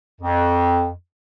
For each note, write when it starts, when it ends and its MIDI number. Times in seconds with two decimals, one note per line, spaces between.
0.21 0.90 41